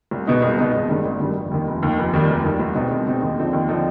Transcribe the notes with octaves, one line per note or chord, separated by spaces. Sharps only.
C2
B2 G#3 B3 D#4
C2
B2 G#3 B3 D#4
G#1
G2 D#3 G3
G#1
G2 D#3 G3
F1
D#2 D#3
F1
D#2 D#3
F1
D#2 D#3 G3
F1
D#2 D#3 G3
C2
B2 G#3 C4 D#4
C2
B2 G#3 C4 D#4
D#2
D3 F3 C4 D#4
D#2
D3 F3 C4 D#4